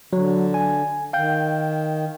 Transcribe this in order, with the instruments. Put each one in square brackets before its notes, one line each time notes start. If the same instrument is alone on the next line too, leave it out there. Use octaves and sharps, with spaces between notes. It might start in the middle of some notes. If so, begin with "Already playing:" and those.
[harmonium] D3 [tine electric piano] F#3
[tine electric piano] G#5
[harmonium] D#3 [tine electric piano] F5 G5 G6